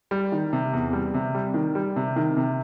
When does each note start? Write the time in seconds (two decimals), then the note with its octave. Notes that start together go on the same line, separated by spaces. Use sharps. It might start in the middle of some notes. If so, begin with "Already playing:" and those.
0.11 G3
0.32 D#3
0.53 C3
0.73 E2
0.93 G3
1.14 C3
1.35 G3
1.54 D#3
1.75 G3
1.96 C3
2.16 D#3
2.37 C3